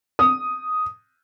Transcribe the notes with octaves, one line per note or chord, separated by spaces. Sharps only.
D#6